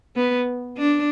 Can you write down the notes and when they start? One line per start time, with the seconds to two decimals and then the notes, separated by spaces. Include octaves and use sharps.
0.16 B3
0.77 D4